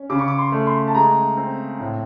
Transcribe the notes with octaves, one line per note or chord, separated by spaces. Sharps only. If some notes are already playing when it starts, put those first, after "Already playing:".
Already playing: C#4
C#3 D6
C#6
D6
C6
A3
C6
A5
G#3 A#5
C4
A2